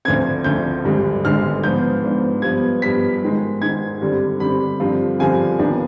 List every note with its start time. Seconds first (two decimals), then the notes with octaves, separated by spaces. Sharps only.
0.05 D2 D3 F3 C4 G#6
0.44 D2 D3 F3 C4 G6
0.85 G#1 G2 D3 G#3
1.24 G#1 G2 D3 G#3 F6
1.63 G#2 F3 B3 D4 G6
2.03 G#2 F3 B3 D4
2.42 G2 F3 B3 G#6
2.82 G2 F3 B3 B6
3.22 G#2 D#3 G#3
3.61 G#2 D#3 G#3 G#6
4.01 G2 D3 G3 C4
4.40 G2 D3 G3 C4 B5
4.80 G2 D3 F3 C4 F4
5.19 G2 D3 F3 C4 F4 G#5
5.59 D#2 D#3 B3 D4